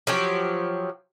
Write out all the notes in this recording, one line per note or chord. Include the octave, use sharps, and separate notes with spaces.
F3 F#3 G4